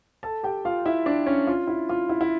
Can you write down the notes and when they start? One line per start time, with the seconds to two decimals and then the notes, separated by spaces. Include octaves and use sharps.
0.23 A4 A5
0.43 G4 G5
0.65 F4 F5
0.86 E4 E5
1.06 D4 D5
1.26 C#4 C#5
1.47 F4
1.67 E4
1.89 F4
2.09 E4
2.21 E4